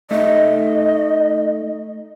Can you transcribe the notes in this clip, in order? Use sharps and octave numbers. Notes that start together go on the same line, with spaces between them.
A3 D#4 D#5 E5